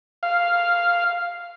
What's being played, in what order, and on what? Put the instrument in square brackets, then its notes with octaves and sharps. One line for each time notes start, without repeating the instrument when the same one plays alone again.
[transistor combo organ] F5